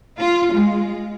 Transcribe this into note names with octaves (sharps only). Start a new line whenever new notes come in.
F4
G#3